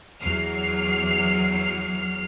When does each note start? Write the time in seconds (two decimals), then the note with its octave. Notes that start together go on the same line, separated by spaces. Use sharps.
0.23 E2 F#3 F6 C7